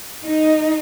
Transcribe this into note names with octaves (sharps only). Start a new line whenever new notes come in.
D#4